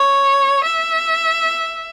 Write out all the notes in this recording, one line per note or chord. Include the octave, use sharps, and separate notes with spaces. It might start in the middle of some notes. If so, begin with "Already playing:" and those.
Already playing: C#5
E5